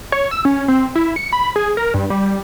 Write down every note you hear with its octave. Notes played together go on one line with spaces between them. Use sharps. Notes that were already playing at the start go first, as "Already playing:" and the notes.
C#5
E6
C#4
C4
E4
C#7
B5
G#4
A#4
G2
G3